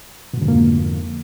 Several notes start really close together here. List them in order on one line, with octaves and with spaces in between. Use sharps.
B2 G#2 D3 F2 A#3